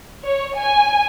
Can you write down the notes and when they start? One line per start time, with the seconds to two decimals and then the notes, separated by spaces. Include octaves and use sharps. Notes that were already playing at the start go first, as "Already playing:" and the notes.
0.24 C#5
0.55 G#5